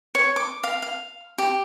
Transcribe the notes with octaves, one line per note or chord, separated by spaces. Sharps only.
C#5
D6
F5
F5
G4